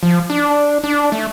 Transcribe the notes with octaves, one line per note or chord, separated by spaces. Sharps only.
F3
D4
D4
A3